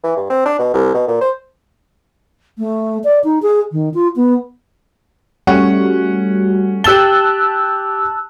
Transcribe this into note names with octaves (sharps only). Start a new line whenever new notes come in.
E3
G2
C4
D4
B2
C2
B2
A#2
C5
A3
D5
D#4
G#4
D#3
F4
B3
G3 A3 C#4 F#4 F#5
G4 A5 E6 F#6 G7